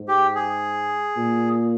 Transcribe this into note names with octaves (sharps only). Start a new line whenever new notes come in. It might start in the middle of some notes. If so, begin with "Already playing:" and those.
Already playing: G#2
G4
G#4
A#2